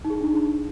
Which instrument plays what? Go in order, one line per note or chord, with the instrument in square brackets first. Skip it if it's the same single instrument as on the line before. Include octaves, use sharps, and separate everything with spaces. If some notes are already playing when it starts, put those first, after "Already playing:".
[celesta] D#4
G#4
D#4
D4